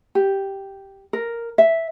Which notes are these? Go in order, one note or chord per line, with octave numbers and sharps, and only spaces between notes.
G4
A#4
E5